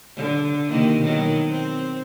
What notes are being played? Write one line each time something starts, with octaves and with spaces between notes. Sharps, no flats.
D3
C3 D#3 A#3
B2 D#3 F#3
C4